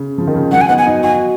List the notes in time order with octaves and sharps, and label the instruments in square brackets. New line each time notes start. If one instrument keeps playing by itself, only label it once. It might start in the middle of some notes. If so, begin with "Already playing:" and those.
Already playing: [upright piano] C#3
C#3 F3
D#3
C#3 F3
[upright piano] D#3 F#3 [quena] F#5
[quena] G#5
[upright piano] B3 D#4 [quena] F#5
[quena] G#5
[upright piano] D#4 F#4
[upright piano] D#4 F#4 [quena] G#5